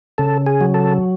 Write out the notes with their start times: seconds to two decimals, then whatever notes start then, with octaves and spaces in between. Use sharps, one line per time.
0.18 C#3 A4
0.46 G#4
0.61 F#3
0.74 A4